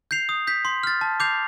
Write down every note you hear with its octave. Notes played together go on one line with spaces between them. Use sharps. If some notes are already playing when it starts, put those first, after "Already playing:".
G6 C7 F7
D#6
G6 B6
C6
F6 A6
A5
D6 G6 C7 F7